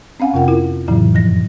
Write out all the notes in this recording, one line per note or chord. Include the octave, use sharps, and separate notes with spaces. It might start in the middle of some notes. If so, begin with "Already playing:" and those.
C4 C#4 F5 F#5 G#5
F2 C3 F4 A#4 F#5 G5
E4 F4 A#4
F2 A2 C#3 E3 F#3 E4
F#2 F3 G3 A#6